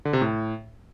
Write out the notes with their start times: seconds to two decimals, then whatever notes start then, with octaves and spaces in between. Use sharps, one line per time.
0.05 D3
0.13 C3
0.21 A2